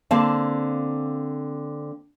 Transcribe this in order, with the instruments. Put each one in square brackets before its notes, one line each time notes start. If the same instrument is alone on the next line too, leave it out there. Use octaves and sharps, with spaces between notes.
[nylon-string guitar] D3 A#3 C4 F5 A5